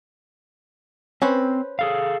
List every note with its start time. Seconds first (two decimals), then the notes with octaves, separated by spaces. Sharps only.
1.22 C4 C#4 B4 C5
1.79 G#4 A4 F5